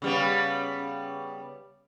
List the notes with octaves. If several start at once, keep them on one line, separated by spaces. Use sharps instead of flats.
C#3 G3 B3